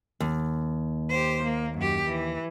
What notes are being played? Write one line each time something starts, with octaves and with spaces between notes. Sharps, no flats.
D#2
G4 C5
A#3
F#2 G4
E3